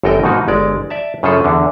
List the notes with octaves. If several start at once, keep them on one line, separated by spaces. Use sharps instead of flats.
G1 F#2 A4 A#4 D#5 G5
G#2 B2 D#3 A#3 D#4 F#4
G1 G#3 D5
D5 E5 A5
F#2 C#3 F3 G#4 A4
E2 D3